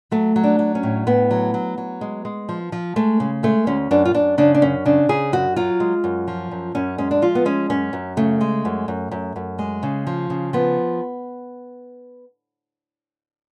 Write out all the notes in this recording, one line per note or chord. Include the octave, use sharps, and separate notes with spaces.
F#3 A3
F#3
D4
F#3
C#4
A2
A2 B3
F#3
F#3
F#3
G#3
G#3
F3
F3
G#3 A3
C#3
G#3 A3
D2 C#4
F#2 D4
F4
F#2 D4
C#3 D4
D4
F#2 C#4
C#3 D4
C#3 G#4
F#2 F#4
F#3 F4
G#3
F#2
F3
F#2
F#2 C#4
G#3 C#4
D4
F3 F4
B3
G#3 C#4
F#2 C#4
F#2
C#3 A3
G#3
F#2
F#2
F#2
F#2
G#3
C#3
F3
C#3
F3 B3